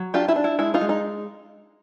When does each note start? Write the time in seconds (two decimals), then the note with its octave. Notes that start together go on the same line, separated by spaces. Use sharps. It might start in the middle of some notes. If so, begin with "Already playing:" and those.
Already playing: F#3
0.14 D4 F4 G4
0.28 E4
0.36 D4
0.44 E4
0.59 G#3 E4
0.74 D#4 F4
0.81 G#3
0.89 D#4